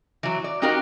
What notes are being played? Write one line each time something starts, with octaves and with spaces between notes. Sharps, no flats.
E3 F#3
D5
C4 D#4 F#4 G4 A#4 F5